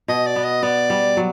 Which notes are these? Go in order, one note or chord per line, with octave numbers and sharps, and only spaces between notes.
B2 D#5
D5
B3
D#5
B3 D5
G3
F#3